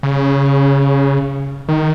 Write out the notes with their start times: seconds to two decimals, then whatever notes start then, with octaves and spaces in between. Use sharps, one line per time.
0.03 C#3
1.68 D#3